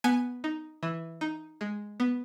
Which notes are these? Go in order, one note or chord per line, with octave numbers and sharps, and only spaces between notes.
B3 G#5
D#4
E3
D#4
G#3
B3